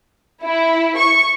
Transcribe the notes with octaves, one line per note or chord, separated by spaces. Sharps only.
E4
C#6